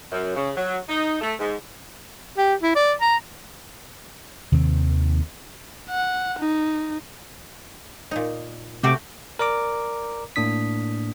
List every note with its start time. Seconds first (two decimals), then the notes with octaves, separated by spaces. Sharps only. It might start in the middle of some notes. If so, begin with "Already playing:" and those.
0.11 F#2
0.36 C#3
0.56 F#3
0.89 D#4
1.21 A3
1.39 G#2
2.37 G4
2.62 E4
2.75 D5
3.01 A#5
4.52 D#2 C3 D#3 C4
5.89 F#5
6.39 D#4
8.11 A#2 D#4
8.83 C3 A3 F#4 G5 D6
9.39 A#4 D5 A#5 D6
10.36 A2 A#3 D4 D#6 B6